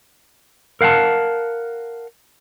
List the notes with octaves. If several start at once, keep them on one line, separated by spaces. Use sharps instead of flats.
A#4 F5 F#5 G#5 A5